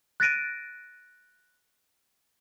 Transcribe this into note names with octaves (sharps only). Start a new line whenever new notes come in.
F#6 A6 A#6 D7 D#7